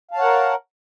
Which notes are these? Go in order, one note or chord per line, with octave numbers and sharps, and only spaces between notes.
A#4 C#5 F5 F#5 A5